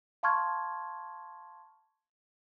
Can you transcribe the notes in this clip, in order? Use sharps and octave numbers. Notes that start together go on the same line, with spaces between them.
F5 A5 C6 C#6 F6 G#6